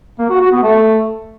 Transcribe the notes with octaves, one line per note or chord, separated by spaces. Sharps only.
A#3
F#4
F#4
B3
A3